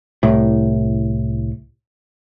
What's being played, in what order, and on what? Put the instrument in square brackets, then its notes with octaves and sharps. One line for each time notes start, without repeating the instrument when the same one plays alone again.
[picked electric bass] C2 A2